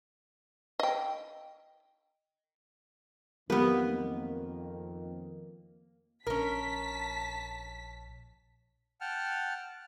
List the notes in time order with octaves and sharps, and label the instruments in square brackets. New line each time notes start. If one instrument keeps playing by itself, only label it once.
[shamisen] D#5 G5
[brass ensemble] F2 D#3 [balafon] F#3 G#3 G4 [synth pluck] A#3 [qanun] B3 B4
[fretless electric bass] A#1 D4 [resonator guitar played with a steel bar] C#4 A#4 [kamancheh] A5 [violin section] B6
[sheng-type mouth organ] F#5 G5 A5 F6